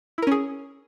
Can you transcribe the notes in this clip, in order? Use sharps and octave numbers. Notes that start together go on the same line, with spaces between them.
C#4 E4 G#4 A#4